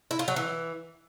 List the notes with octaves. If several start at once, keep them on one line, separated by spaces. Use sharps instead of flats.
E4
F4
F#3
E3